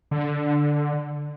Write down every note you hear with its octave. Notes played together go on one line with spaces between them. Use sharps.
D3